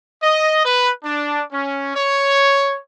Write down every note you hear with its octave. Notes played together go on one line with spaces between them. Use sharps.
D#5
B4
D4
C#4
C#5